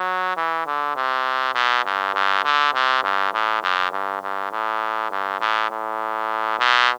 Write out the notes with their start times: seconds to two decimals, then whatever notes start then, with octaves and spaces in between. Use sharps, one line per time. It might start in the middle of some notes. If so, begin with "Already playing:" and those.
Already playing: F#3
0.37 E3
0.66 D3
0.96 C3
1.55 B2
1.85 G2
2.14 G2
2.44 D3
2.74 C3
3.03 G2
3.33 A2
3.63 F#2
3.92 G2
4.22 G2
4.51 A2
5.11 G2
5.40 A2
5.71 A2
6.59 B2